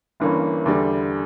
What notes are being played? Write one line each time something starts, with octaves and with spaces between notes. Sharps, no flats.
G1 G2 E3 A#3 C#4
E2 D3 G3